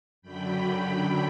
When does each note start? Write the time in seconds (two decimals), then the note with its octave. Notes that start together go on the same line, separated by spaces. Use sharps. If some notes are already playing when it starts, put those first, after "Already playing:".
0.22 F#2 D3 F#3 G5 B5
0.53 G5 B5